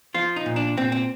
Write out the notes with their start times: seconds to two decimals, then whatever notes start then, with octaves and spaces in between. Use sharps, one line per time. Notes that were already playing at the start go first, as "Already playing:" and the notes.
0.14 F3 F4
0.36 D#4
0.46 A#2
0.56 D4
0.77 A#2 C4
0.92 C4